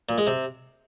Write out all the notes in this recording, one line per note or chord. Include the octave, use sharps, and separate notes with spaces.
A#2
G#3
C3